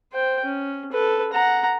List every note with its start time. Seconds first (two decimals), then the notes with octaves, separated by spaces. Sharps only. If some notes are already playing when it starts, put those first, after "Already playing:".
0.12 C5 G5
0.45 C#4
0.92 A4 B4
1.33 F#5 A#5